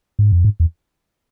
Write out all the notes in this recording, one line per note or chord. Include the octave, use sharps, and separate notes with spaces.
G#2
F2
G#2
E2